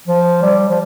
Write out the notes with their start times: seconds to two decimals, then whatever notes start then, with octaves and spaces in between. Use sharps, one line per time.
0.08 F3
0.42 G3
0.69 F3